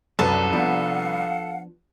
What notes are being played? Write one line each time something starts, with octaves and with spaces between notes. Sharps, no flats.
C2 F#2 A4 B4 A5
F3 B3 D4 F5 F#5